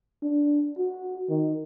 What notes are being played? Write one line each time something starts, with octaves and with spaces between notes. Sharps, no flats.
D4
F#4
D#3